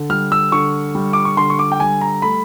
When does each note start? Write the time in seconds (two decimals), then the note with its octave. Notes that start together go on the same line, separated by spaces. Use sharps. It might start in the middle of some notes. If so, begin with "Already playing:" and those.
Already playing: D3
0.10 G3 F6
0.32 E6
0.52 D3 C#6
0.95 G3
1.13 D6
1.25 C#6
1.37 D3 C6
1.50 C#6
1.59 D6
1.72 G5
1.80 G3 G#5
2.01 A#5
2.22 A3 B5